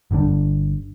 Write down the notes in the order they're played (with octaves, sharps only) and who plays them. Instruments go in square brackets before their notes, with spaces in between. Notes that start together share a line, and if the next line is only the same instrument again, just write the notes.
[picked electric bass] G1 D3 G3 D4